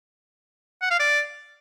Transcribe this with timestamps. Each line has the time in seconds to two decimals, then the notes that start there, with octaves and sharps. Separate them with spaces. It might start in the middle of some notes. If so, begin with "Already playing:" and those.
0.81 F#5
0.90 F5
0.99 D5